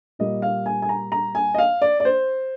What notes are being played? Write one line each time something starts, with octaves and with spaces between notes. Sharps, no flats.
A#2 G3 A#3 D#5
F5
G#5
G#5
A#5
A#5
G#5
D#5
F5
D5
D5
C5